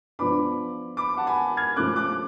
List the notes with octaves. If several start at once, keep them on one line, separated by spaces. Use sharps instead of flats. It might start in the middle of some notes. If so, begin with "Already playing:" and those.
F3 B3 D4 B5 D6
B5 D6
F#5 A5
G#5 B5
F6 G#6
F3 A3 C#4 D6 F#6
D6 F#6